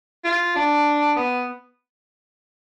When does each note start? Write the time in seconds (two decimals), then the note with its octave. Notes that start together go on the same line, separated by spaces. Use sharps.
0.24 F4
0.55 D4
1.16 B3